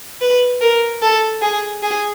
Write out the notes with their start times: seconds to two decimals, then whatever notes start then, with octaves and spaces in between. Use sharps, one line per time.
0.21 B4
0.61 A#4
1.02 A4
1.42 G#4
1.83 G#4